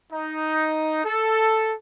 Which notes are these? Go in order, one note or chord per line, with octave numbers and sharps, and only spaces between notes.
D#4
A4